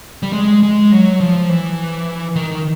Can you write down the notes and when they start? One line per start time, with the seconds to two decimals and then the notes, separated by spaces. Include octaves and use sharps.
0.23 G3
0.33 G#3
0.63 G#3
0.92 F#3
1.20 F3
1.49 E3
2.35 D#3